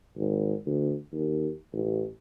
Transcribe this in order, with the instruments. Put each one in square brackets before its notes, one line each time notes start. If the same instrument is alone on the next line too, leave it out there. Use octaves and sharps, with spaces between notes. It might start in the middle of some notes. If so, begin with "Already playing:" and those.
[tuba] G#1
D2
D#2
A1